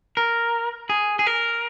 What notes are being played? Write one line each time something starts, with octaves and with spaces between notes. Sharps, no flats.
A#4
G#4
G#4
A#4